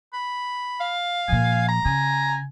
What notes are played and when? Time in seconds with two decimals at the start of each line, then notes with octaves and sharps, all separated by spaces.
0.13 B5
0.81 F5
1.28 A#2 F3 G#5
1.69 A#5
1.85 C#3 G#5